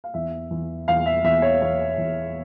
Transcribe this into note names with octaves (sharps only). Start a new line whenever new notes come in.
F5
E2 E5
E2
E2 F5
E5
E2 E5
C#5
E2 C#5
E2